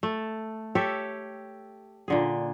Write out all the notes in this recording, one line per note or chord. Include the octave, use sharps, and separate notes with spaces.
A3
G4 A4 C#5 E5
A#2 D3 G#4